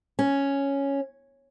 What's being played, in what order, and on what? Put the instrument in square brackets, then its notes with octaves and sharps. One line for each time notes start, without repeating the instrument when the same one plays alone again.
[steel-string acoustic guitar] C#4